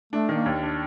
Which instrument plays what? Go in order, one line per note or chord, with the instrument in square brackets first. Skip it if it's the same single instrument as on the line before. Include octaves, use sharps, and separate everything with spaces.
[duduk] A3 [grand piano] D4
[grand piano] D#3
[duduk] A#3
[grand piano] D#2
D4